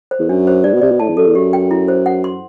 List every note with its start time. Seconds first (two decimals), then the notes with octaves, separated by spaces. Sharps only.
0.11 C5
0.20 E2
0.29 F#2 D4
0.47 C5
0.64 G2 D5
0.74 B2
0.81 C3 D5
0.91 B2
1.00 A2 A5
1.09 E2
1.17 F#2 A4
1.26 E2
1.35 F#2 G4
1.53 G5
1.71 E4
1.88 C5
2.06 F#5
2.24 C6